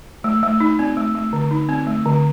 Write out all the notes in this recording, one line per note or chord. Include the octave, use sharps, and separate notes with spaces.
A3
A3
D#4
C4
A3
A3
D3
D#4
C4
A3
D3